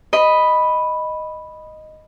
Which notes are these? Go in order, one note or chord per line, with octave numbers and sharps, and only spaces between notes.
D#5 B5